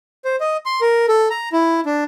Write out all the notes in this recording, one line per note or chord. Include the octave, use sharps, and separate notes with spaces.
C5
D#5
C6
A#4
A4
A#5
E4
D4